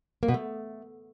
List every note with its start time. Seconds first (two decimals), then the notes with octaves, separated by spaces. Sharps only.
0.23 A#3
0.28 B2
0.34 A3